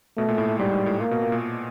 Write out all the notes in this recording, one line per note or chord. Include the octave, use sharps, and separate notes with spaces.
B2 A3
A#2
A2
A2
G#2 G3
G#2
A2
A#2 A#3
B2
A#2
A#2